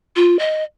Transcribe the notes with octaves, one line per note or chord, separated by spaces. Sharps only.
F4
D#5